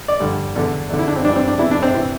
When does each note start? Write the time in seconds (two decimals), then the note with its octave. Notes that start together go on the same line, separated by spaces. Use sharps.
0.08 D5
0.20 G2 D3
0.55 E2 D3
0.89 E2 D3
0.99 E4
1.08 D4
1.16 C4
1.25 G2 E3 D4
1.36 C4
1.47 D4
1.59 E2 C3 E3 E4
1.71 D4
1.82 C4
1.94 C3 E3